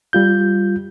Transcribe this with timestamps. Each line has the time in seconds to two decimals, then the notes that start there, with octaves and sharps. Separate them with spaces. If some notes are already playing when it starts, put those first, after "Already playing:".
0.13 G3 F4 G6